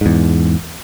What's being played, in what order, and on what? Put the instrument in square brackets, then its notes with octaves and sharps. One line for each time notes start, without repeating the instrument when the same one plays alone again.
[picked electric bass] E2 G#2